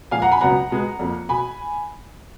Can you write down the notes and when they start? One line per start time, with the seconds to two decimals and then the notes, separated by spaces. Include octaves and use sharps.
0.11 A#2 F3 G#3 F5 G#5
0.22 F#5 A#5
0.31 G#5 B5
0.41 C#2 B2 F#3 B3 F#5 A#5
0.71 B2 G#3 B3
0.99 F2 F3 A#3
1.29 B2 G#5 B5